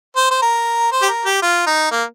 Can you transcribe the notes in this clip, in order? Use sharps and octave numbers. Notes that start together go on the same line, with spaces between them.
C5
C5
A#4
C5
G4
A#4
G4
F4
D#4
A#3